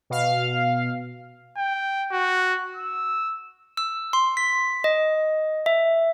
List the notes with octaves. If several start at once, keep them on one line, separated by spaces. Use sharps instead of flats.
B2 F5
G5
F#4
E6
E6
C6
B6
D#5
E5